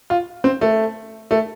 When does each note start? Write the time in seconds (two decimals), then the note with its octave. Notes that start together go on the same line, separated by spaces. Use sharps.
0.10 F4
0.44 C4
0.61 A3
1.31 A3